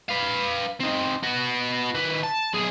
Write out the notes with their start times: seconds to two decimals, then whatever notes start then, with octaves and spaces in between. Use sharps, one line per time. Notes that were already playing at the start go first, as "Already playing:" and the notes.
0.09 B4 F5
0.80 C4 D#4
1.23 B3 F#4
1.95 D#3 B4
2.23 A5
2.54 B1 G#4